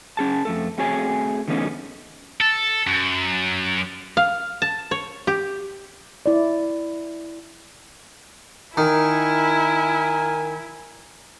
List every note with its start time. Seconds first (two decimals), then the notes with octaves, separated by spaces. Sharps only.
0.17 C#4 G#4 A5
0.45 F2 A3 A4
0.78 A3 C4 F#4 G#4 C#5 G#5
1.48 D3 E3 A3 B3 C#4 D#4
2.41 A4
2.87 F#2
4.17 F5
4.62 A5
4.91 C#5
5.27 G4
6.26 E4 D5
8.77 D#3 E4 A#4 G#5